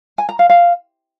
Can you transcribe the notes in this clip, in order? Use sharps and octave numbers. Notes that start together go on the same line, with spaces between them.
G#5
A#5
F5
F5